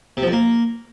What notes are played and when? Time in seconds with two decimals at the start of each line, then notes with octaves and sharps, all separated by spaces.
0.17 C3
0.22 F3
0.27 F2
0.32 A#3